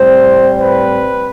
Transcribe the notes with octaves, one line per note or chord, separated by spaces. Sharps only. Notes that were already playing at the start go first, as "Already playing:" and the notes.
Already playing: A2 G3 C4 C5
B4